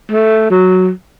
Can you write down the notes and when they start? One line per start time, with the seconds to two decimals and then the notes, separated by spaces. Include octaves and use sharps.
0.12 A3
0.51 F#3